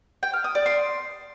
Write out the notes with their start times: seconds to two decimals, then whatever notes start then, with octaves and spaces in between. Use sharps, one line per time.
0.23 G5
0.33 F6
0.44 D#6
0.55 D5
0.66 C6